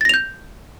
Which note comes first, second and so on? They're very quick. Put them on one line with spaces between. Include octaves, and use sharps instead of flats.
A6 A#6 F7 G6